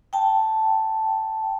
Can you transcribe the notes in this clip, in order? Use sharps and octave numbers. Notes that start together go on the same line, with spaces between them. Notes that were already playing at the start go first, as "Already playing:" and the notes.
G5 A5